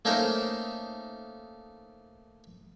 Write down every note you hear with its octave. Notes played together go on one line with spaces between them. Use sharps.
A3 A#3 C#4 D#4 A#4 C5